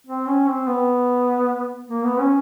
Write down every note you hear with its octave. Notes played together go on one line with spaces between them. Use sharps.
C4
C#4
C4
B3
A#3
B3
C#4